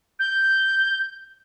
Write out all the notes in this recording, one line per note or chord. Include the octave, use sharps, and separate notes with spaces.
G6